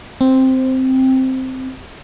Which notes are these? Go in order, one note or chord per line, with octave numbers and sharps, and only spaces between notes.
C4